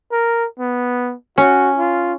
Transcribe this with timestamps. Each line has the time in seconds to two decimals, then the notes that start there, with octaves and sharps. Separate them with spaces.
0.12 A#4
0.59 B3
1.38 C#4 F#4
1.77 F4